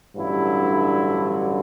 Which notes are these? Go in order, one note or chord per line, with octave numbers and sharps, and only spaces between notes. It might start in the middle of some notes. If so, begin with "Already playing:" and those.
A1 G2 D3 F#3 E4